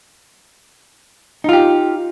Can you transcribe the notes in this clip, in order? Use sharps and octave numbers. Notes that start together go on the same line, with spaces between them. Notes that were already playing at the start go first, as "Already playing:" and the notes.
D#4 F4 G4